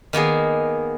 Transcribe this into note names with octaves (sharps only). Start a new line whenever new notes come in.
D#3 A#3 B3 G#4